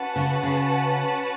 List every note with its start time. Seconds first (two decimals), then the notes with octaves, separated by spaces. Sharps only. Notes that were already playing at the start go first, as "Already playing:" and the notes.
Already playing: C#4 F#4 B4 F#5 A5
0.16 C#3
0.43 C#3